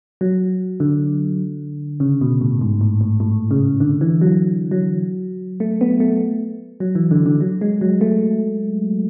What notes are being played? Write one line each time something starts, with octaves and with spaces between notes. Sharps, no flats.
F#3
D3
C#3
B2
A2
G#2
A2
A2
A2
C#3
D3
E3
F#3
F#3
A3
B3
A3
F#3
E3
D3
D3
F#3
G#3
F#3
A3